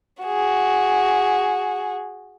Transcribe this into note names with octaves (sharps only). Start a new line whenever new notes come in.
F#4 G#4